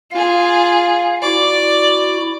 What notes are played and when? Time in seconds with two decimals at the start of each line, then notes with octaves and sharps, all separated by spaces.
0.11 F4 G#4 F5
1.22 E4 F#4 D5